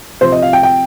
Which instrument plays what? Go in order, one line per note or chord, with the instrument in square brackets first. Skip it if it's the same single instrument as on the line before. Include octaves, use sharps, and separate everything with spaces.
[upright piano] C3 F3 C5
D#5
F5
G5
G5